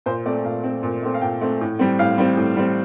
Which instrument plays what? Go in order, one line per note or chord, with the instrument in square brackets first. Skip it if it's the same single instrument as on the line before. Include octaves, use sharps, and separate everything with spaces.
[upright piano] A#2 C5
A3 C4 D5
A#2 F5
A3 C4
A#2
A3 C4
F5
A#2 G5
A3 C4
A2
G3 C4
A2 F5
G3 C4
A2
G3 C4